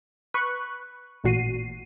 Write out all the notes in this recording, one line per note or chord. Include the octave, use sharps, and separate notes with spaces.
B4 C#6 F#6
A1 A#2 F#4 C7 D#7